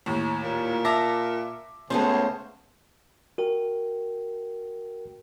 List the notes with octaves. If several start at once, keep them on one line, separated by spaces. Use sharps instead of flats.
D#2 A2
A#2
E5 A5 A#5 D6 A#6
C#2 G#3 A3 B3 C#4 C5
F#4 A#4 G5